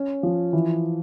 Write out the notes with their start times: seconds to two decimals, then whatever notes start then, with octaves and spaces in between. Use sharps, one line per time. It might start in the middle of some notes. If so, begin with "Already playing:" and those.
Already playing: C#4
0.23 F3
0.53 E3